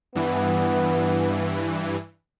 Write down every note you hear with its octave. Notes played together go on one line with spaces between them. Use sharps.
G2 E3 B3